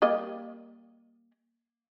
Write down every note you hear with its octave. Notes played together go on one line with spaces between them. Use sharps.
G3 A#3 D#5